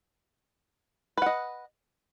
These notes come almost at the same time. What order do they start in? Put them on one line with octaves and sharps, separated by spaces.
B4 F#5 D#5